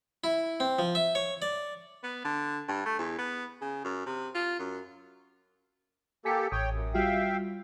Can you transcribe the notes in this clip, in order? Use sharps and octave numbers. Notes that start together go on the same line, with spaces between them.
E4
C4
F3
E5
C#5
D5
B3
D3
G2
A3
E2
B3
C#3
F#2
C3
F4
F#2
A#3 G4 A4 G#5 B6 C#7
A1 C#5 G5 D#6
F#2
G3 F4 F#4 E5 F5 G5